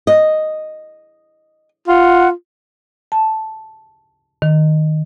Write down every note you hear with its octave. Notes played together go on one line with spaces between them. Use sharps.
D#5
F4 F#5
A5
D#3